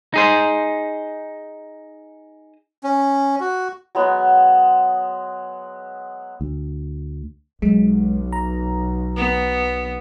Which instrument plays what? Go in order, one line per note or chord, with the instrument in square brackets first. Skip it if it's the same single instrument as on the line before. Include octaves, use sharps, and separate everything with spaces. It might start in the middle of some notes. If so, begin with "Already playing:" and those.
[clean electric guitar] D#4 G#4 C5
[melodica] C#4
F#4
[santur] F#3 G#3 B3
[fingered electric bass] D2
[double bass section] B1 [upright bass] F#3 [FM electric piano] G#3
[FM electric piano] A#5
[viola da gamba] B3